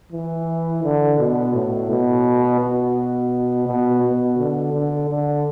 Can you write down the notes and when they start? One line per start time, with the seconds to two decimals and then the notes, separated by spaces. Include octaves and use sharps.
0.13 E3
0.84 D3
1.19 B2
1.54 A2
1.90 B2
2.60 B2
3.67 B2
4.03 B2
4.38 D3
4.73 D3
5.09 D3